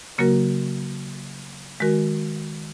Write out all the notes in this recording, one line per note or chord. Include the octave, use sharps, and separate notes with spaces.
C#3 F#3 A#3 F#4 A#4
D#3 G#3 F#4 A#4